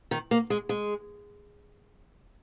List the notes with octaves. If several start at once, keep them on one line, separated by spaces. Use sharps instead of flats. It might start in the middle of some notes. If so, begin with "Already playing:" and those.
D#3
A#3
G#3
G#3